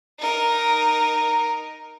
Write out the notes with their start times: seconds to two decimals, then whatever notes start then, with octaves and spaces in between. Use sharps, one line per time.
0.19 D#4 A#4